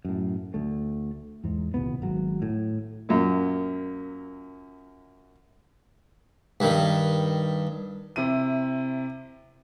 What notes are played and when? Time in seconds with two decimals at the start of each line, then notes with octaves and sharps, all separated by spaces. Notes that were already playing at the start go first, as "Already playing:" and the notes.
0.05 F#2 A2
0.54 D2 A3
1.44 E2 G#2
1.74 D#1 C2 B3
2.02 G#1 F#3
2.42 A2
3.09 F#2 A#2
6.60 G2 D#3
8.16 C3 E4 D#7